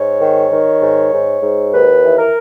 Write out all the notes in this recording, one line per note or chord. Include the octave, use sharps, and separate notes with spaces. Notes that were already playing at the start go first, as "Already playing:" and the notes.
Already playing: G#2 C#5
D#3
D#3
G#2
G#2
G#2
D#2 B4
E3
A#4